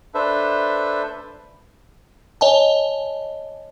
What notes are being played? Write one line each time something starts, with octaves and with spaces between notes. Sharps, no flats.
D4 A4 B4 C5 E5
C#5 D#5 G#5 A5